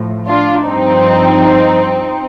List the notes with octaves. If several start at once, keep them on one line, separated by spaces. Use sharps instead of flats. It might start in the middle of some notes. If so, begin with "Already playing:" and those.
Already playing: A2 F3
D4 F4
G2 F3 C4 D#4